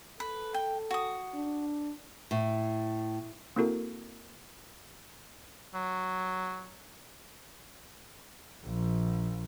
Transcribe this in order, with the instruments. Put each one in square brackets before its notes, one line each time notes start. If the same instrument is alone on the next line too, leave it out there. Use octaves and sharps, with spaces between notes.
[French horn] A4 [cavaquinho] B4
[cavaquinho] G5
F#4 D#6
[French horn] D4
[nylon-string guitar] A2
[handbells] A#3 C4 E4 F#4 A4 A#4
[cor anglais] F#3
[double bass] A#1